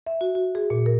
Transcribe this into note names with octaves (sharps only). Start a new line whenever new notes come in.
E5
F#4
F#4
G#4
A#2
A#4